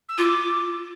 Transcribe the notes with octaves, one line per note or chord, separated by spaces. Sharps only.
E6
F4 D6